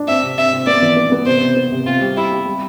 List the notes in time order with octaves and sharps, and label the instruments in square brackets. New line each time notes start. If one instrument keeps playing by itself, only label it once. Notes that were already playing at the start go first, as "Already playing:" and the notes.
Already playing: [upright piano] D4
[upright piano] C4 [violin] E5
[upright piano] C3
[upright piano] C3 [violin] E5
[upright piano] C4
[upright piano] B3 [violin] D5
[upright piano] E3
B3
B3
[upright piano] C3 [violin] C5
[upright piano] C3
B3
C3
[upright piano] C4 [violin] F4
[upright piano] G3
[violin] E4 [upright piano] G4
[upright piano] G4
G3